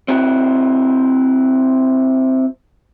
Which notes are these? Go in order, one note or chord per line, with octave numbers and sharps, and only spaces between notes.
C4 E4 F#4